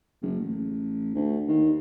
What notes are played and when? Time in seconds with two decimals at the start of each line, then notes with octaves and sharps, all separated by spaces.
0.22 F#1
0.40 A1
1.15 D2
1.48 D#2